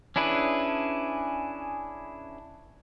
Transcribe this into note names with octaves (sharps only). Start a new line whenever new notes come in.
C#4 D4 E4 G#4 B4